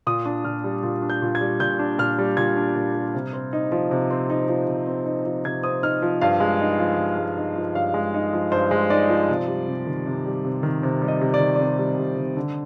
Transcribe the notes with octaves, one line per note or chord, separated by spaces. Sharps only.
A#2 D#6
D4
A#2 F6
G3
A#2
D4
G6
A#2
G#6
G3
A#2 G6
D4
A#2 F6
G3
A#2 G#6
D4
A#2
G3
C3
C4
D#4
F3
C3
C4
D#4
F3
C3
C4
D#4
F3
C3 G#6
C4 D#6
D#4 F6
F3
G2 F5
G#3
D#4
F3
G2
G#3
D#4
F3
G2 F5
G#3
D#4
F3
G2 C5
G#3
D#4 D5
F3
C3
G3
C3
D#3
C3
G3
C3
D#3
C3
G3
D#5
C3
D5
D#3
D5
C3 C5
G3
C3
D#3
D3